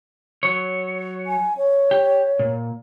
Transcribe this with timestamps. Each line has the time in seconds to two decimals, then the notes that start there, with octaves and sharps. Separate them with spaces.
0.43 F#3 C#5
1.27 G#5
1.57 C#5
1.91 G4
2.39 A#2